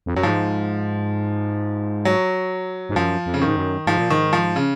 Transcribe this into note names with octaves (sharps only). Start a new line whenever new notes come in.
F2
F#2 F#3
G#2 F3
F#3
G#2
F#2 F3
F2
C#3
G#2 D#3
F#2
G#2 F3
A#2
G#2 D#3
F3
C#3